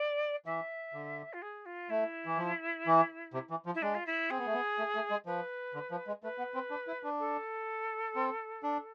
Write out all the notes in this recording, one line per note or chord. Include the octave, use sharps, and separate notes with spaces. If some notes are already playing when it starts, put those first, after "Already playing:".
Already playing: D5
E3 E5
D3
F4
G#4
F4
A3 E4
E3
F3
E3
C3
E3
F3
E4
G#3 D4
F4
E4
C4 G#4
B3
A3
B3
A3
A3
G#3
F3 B4
D3
F3
G#3
A3 B4
B3
C4
D4
E4
D4
A4
C4
D4